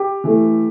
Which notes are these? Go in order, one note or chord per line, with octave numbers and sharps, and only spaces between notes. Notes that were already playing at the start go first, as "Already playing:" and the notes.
Already playing: G4
E3 A3